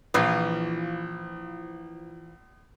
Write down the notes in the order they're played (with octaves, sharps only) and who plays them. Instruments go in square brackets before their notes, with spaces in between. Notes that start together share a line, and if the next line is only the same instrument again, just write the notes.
[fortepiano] A#1 [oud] E3 F3 F4